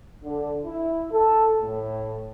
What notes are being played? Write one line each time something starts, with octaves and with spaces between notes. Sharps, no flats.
D3
E4
A4
A2